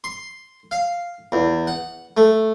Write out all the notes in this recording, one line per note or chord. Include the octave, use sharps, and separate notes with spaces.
C6
F5
E2
F#5
A3